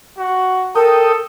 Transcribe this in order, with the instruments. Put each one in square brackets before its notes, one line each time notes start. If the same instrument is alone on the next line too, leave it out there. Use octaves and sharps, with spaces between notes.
[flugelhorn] F#4
[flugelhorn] A4 [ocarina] A#4 [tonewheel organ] G5 D#6